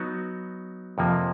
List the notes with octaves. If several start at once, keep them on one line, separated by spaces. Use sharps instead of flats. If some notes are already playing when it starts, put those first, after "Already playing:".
Already playing: F#3 B3 D#4 F#4
F2 C3 F3 A#3